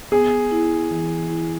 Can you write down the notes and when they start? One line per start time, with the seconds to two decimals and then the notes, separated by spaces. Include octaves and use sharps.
0.12 B3 G#4
0.51 E4
0.91 E3
1.30 E4